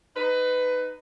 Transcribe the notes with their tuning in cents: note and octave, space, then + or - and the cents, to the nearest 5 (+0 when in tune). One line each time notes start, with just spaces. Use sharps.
D#4 +0 B4 +20